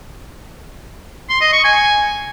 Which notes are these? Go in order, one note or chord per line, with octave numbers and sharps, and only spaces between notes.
C6
D#5
C#6
G#5